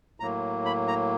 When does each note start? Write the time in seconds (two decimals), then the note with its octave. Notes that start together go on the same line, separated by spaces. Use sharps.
0.20 A2 F#3 A#3 A#5
0.66 B5
0.88 A#5